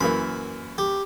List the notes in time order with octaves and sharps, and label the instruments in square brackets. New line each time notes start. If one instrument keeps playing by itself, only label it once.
[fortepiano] F#2 E3 A#3 [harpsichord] B5
[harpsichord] G4